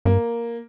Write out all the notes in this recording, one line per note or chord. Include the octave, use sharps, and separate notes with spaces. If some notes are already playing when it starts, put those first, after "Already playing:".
G2 A#3